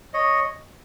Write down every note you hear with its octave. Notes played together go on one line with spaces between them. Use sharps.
C#5 D#5